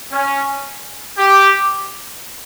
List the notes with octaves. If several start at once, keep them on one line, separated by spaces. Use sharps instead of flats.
C#4
G4